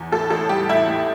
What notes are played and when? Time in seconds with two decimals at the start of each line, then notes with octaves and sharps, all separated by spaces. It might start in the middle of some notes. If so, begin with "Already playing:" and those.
Already playing: E2
0.12 A2 A4
0.30 A1 A4
0.49 G3 G4
0.69 A1 E4
0.88 A2